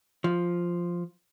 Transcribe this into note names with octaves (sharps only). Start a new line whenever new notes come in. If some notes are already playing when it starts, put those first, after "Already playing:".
F3